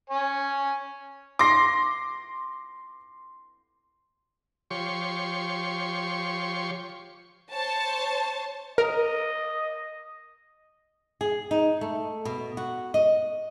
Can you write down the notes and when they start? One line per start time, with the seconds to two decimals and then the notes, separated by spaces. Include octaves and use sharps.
0.10 C#5 G#5
1.39 C6 D6 A#6
4.71 F3 G4 C#5 C6 C#6
7.52 C5 C#5 A5
8.78 A#4 D#5
11.21 G#4
11.51 D#4
11.81 A3
12.25 B2
12.57 F#4
12.94 D#5